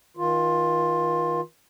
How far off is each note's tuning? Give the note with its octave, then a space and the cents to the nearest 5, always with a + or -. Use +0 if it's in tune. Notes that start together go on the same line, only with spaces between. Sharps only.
D#3 +45 F4 +15